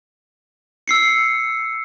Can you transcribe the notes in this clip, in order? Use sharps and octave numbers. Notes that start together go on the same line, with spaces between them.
E6 C7 C#7